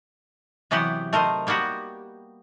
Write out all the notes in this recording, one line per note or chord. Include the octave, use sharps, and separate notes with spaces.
C3 E3 F#3 B3 G4 F#5
A3 A#4 C5 D#5
G3 A#3 B3 F#4 G4